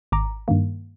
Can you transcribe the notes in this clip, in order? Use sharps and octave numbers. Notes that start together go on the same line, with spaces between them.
G#1 A#5 D6
G2 D#3 A#3